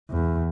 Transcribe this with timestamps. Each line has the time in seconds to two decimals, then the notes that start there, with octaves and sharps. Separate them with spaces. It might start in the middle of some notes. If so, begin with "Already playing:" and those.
0.10 E2